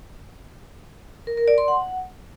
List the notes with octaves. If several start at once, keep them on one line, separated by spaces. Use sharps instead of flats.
A#4
A#4
D5
C6
F#5